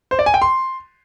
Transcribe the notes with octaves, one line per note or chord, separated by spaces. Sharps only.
C5
D5
G#5
G5
C6